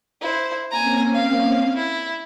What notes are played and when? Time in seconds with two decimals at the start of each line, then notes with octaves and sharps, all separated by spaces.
0.21 E4 C5
0.71 A#3 C4 C#4 G#5 A#5
1.14 F5
1.75 E4